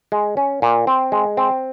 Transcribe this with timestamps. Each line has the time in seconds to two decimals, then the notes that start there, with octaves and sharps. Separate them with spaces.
0.12 G#3
0.37 C#4
0.62 A#2
0.87 C4
1.12 G#3
1.37 C4